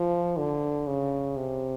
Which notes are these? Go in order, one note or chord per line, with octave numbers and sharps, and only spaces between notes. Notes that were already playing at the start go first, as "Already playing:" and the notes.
Already playing: F3
D3
C#3
C3